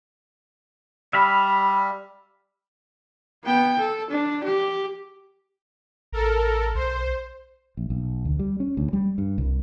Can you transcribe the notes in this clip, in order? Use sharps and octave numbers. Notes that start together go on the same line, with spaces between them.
G3 E5 F5 B5
B3 G5
A4
D4
G4
A1 A4 A#4
B1 C5
A#1
B1
D2
G3
C#4
D2
G3
G2
C2